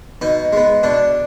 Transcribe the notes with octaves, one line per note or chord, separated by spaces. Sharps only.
B2 D#4
G#3 B3
B2 D4